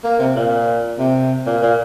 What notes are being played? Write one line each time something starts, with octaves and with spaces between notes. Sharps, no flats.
A#3
C3
A#2
C3
A#2
A#2